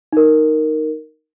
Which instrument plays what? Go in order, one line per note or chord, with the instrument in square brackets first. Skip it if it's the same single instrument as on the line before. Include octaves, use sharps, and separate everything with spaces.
[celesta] D#4 A#4